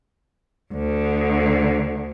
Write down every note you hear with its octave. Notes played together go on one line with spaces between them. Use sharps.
D2 D3